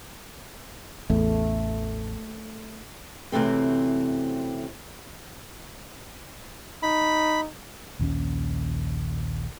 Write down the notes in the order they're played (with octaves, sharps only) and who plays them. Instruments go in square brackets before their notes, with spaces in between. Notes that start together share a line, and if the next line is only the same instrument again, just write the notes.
[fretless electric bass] A1 E2 [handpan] A3
[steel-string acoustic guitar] F#2 C3 E3 A3 C4
[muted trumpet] D#4 [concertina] B5
[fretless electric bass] A#1 D#2 D#3 C#4